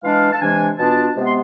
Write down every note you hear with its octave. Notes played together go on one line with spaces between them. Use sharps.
E3 G#3 D4 F5
A5
C3 E3 G#3 D4 G#5
B2 B3 D4 F4 A5
C3 G#3 B3
C6